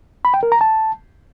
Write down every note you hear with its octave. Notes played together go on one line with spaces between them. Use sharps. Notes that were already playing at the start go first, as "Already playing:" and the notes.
B5
G5
A#4
A#5
A5